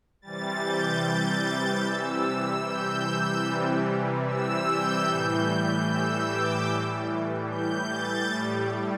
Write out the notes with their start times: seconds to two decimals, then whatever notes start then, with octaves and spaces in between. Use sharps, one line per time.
0.22 C3 E3 G3 A6
0.62 G6
1.03 G6
1.84 C3 E3 G3 E6
2.24 E6
2.65 G6
3.45 C3 E3 G3
4.26 E6
4.66 G6
5.07 A2 E3 G3 G6
5.47 G6
5.87 E6
6.28 D6
6.68 A2 E3 G3
7.49 G6
7.90 A6
8.30 A2 G3